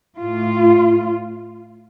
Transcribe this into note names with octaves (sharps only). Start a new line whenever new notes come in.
A2 F4